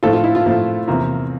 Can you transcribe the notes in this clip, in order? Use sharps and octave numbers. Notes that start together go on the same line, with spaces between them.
A2 F3 A3 C4 F4 A4
F4
E4
F4
A2 F3 A3 C4
E2 C3 F3 A#3